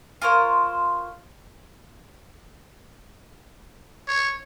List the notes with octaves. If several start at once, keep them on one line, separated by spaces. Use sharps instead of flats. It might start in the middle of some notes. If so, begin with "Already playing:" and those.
F4 A#4 C5 C#5
C#5